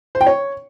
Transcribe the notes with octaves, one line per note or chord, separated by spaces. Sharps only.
C5
G5
C#5